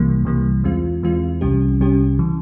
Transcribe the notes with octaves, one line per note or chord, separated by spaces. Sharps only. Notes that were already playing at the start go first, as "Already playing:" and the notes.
Already playing: C2 C3 E3 G3 A#3
C2 C3 E3 G3 A#3
E2 E3 G#3 C4 F4
E2 E3 G#3 C4 F4
C2 C3 G3 C#4 G4
C2 C3 G3 C#4 G4
C#3 E3